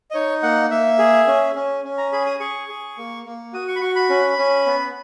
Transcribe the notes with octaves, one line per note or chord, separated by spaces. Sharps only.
D#5
D#4 C#5
A#3 F#5
A#3 E5
G#4
C#4
C#4
C#4
A#5
G#4 B5
D#6
G#4 C#6
G#4
A#3
A#3
F#4 D#6
C#6
B5
F#4 C#6
B5
C#4
C#4
B3